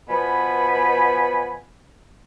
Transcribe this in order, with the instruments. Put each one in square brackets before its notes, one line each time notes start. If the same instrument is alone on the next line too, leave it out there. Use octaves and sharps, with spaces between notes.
[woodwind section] B2 F3 B3 G#5 B5